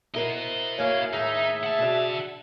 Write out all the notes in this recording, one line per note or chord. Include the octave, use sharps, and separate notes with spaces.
E4 F#4 A#4 C5 D#5
F#2 A#3 E4 C#5 F5
D#2 A2 D#4 G#4 E5
F#5 A5
B2 D4